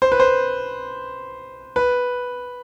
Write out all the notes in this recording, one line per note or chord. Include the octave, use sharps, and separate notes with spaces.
C5
B4
C5
B4